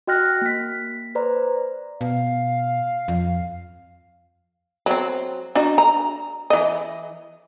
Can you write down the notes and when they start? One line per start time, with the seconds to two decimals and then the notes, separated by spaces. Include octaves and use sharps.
0.07 F#4 D#5 G5 F6 F#6 A#6
0.42 A#3 B6
1.15 B4 C5 D5 A#5
2.01 B2 F5
3.08 F2
4.86 F#3 C4
5.55 D4 D#4 F#4
5.78 A#5
6.50 E3 D#5